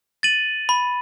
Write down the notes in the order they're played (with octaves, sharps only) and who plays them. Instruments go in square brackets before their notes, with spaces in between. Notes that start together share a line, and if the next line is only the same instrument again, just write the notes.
[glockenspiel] A6 D#7 F#7
B5